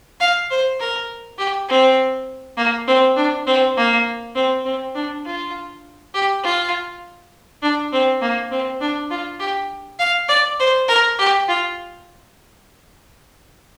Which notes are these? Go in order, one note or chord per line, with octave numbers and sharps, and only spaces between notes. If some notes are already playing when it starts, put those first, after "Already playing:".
F5
C5
A#4
G4
C4
A#3
C4
D4
C4
A#3
C4
C4
D4
F4
G4
F4
D4
C4
A#3
C4
D4
F4
G4
F5
D5
C5
A#4
G4
F4